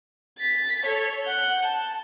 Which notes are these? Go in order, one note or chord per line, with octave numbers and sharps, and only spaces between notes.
A6 B6
A4 C#5
F#5 G6
A5